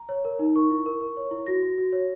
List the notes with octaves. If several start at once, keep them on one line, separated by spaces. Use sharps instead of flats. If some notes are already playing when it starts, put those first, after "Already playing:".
Already playing: A#5
C#5
A#4
D#4
A#4 C#6
E4
A#4
A#4
C#5
E4
F#4 A#6
F#4
F#4
C#5